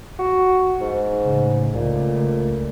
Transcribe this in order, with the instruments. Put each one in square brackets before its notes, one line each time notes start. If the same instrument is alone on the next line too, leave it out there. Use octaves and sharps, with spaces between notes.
[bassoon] F#4
G#2
[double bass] A1 C#3
[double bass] C#2 A3 [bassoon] A#2